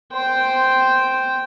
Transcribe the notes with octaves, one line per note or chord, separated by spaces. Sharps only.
C5 G5